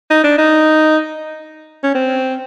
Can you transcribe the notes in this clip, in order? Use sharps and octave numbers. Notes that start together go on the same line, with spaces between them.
D#4
D4
D#4
C#4
C4